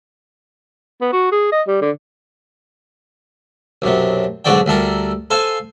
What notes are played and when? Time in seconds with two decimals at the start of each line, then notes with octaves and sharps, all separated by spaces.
1.01 B3
1.13 F#4
1.32 G#4
1.52 D#5
1.68 G3
1.82 D3
3.82 B1 F#2 C3
4.45 B1 G#2 D3 F#4 D5 G5
4.66 D2 G3 A4 A#4
5.30 A4 C5 F5 G#5